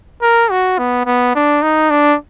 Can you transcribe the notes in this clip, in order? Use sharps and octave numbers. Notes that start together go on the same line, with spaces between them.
A#4
F#4
B3
B3
D4
D#4
D4